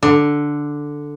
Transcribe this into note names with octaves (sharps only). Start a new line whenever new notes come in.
D3